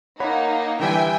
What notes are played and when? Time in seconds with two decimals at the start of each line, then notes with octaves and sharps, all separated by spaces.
0.20 A#3 D#4 C#5 F#5 B5
0.80 D3 E3 G3 E5 G5 G#5